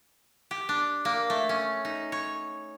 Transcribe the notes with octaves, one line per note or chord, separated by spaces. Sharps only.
G4
D4
A#3
A3
C#4
D#4
C#5